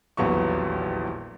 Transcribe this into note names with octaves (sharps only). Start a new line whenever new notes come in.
D#1 A#1 E2 F#3 B3 C#6